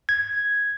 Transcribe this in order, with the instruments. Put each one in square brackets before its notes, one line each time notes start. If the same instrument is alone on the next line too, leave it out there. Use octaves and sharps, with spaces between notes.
[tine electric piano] G#6